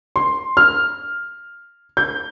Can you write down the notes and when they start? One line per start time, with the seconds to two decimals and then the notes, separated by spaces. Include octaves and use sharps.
0.16 C6
0.57 F6
1.97 G6